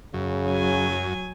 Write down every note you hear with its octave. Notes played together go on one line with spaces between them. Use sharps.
F#2 C#3
F#3 G#5